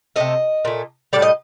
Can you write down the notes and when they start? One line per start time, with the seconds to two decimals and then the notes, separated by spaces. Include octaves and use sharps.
0.16 C3 D#3 A3 D#5
0.65 A#2 A3
1.13 A2 G3 D5
1.22 D#5